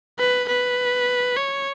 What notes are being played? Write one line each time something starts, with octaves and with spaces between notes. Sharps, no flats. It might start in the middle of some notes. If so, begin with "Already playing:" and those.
B4
B4
C#5